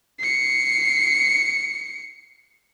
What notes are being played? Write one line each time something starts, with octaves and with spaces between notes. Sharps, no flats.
C7 C#7